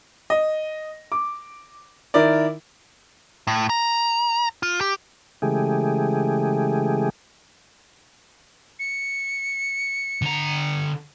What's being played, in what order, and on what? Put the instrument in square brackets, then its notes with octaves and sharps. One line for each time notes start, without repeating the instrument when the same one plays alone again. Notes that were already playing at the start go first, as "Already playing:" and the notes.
[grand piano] D#5
D6
D#3 E4 A#4 D5
[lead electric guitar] A2
A#5
F4
G4
[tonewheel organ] C#3 E3 G#3 A3 G4 G#4
[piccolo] C#7
[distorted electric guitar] D3 A#5